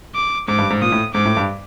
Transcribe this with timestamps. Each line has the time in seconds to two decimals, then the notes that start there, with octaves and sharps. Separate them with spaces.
0.15 D6
0.48 G#2 D6
0.58 G2
0.70 G#2
0.81 A#2 D#6
0.92 A2
1.14 G#2 D6
1.25 A2
1.37 G2